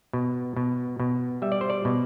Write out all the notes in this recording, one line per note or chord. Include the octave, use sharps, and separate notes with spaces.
B2
B2
B2
G3 E5
D5
C5
D5
B2